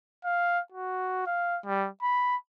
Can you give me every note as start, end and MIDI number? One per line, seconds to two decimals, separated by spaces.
0.25 0.60 77
0.72 1.26 66
1.26 1.59 77
1.66 1.88 55
2.03 2.36 83